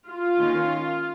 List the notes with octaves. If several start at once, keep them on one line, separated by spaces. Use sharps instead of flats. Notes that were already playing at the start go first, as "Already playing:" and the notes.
F4
D#3 A#3 C#4